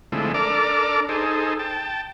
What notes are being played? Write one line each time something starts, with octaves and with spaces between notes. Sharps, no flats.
D3 F3 G#3 A3 C4 E4
D4 A4 A#4 D5 D6 F6
D#4 G#4 A4 C5
G5 A5